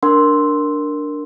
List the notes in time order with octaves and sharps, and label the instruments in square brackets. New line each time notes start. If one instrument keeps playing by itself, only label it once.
[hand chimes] D4 A#4 F#5 C6 E6